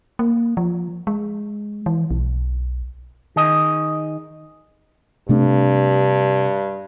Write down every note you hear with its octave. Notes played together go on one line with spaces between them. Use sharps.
A#3
F3
G#3
E3
B1
D#3 G#4 D#5
G2 C3 A3 D4